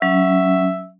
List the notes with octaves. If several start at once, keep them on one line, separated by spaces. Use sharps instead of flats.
F#3 C#4 E5